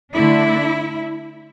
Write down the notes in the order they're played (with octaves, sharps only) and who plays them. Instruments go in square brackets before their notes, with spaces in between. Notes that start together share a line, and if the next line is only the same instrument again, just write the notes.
[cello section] D3 A3 D4 E4